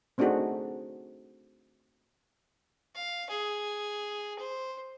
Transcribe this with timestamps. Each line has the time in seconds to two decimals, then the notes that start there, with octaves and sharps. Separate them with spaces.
0.18 A3 C4 D4 D#4 F#4 G#4
2.95 F5
3.29 G#4
4.39 C5